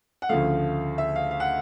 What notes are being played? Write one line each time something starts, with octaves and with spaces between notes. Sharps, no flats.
F#5
D2 C#3 F3 A3 F5
E5
F5
F5
F#5